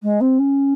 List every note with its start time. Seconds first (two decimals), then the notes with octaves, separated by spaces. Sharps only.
0.03 G#3
0.21 C4
0.39 C#4